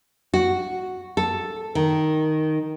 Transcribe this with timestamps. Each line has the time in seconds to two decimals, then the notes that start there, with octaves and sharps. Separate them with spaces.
0.34 F#4
1.17 A4
1.75 D#3